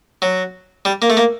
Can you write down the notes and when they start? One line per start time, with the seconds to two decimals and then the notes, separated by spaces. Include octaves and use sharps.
0.22 F#3
0.85 G3
1.02 A#3
1.10 A3
1.17 A#3